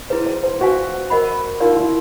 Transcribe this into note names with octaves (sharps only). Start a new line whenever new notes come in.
E4 G#4 B4 C5
C5
C5
F#4 B4 D5 F5 G#5
A#4 D#5 F#5 B5
D#4 F4 F#4 A#4 D5
F4
E4